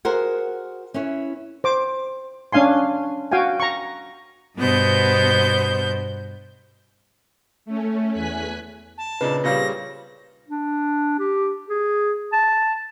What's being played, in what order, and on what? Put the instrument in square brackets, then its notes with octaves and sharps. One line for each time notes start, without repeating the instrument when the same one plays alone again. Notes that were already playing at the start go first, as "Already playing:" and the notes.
[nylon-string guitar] F#4 G#4 A#4 C5 F#5
C#4 E4 B4 C#5
[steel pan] C5 D6
C#4 D4 F5 G#5 C6
F#4 F5 G5 G#5
A#5 C#6
[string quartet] G2 B2 B3 C5 G6
[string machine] A3 C#4
E2 G#5 F#6 B6
[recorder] A5
[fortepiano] A#2 D4 D#4 [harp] C#3 [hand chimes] B4
[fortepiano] A#2 C#3 G3 [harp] C5 C#5 F5 [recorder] A#6
[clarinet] D4
G4
G#4
A5